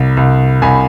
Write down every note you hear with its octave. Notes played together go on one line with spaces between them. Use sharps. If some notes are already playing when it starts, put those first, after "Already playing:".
Already playing: C2
C2
C2 G#5 B5